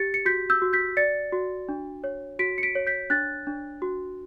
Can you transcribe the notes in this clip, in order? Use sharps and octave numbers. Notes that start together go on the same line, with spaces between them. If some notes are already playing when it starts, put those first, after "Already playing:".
Already playing: G4 A6 C#7
C#7
F#4 G6 B6
E6 G6
F#4
G6 B6
D5 A6 C#7
F#4
D4
C#5
F#4 B6 D7
C#7
B6 D7
C#5
G6 B6
D4 F#6 A6
D4
F#4